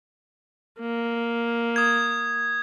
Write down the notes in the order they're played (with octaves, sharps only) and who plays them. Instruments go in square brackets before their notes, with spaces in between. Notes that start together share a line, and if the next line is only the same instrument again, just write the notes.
[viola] A#3
[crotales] D#6 G#6